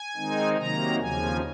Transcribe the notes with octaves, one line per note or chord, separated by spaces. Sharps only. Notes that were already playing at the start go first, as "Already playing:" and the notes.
Already playing: G#5
D#3 G#3 C4 D#4
C3 D#3 F#3 A#3 A#5
D#2 C#3 F3 G#5